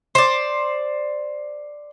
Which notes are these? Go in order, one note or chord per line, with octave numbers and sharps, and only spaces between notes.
C5 D5